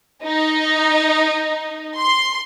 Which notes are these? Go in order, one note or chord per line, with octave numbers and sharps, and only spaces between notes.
D#4
C6